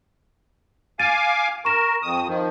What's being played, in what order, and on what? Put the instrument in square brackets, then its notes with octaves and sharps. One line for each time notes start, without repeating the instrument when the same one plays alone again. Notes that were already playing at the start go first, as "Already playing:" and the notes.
[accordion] F5 G#5 D6 [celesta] A6 D#7
[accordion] A#4 [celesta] C#6 E7
[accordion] F2 D#6
D#3 F3